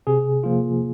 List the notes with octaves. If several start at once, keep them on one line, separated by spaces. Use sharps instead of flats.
C3 G#4
F3 A#3 F4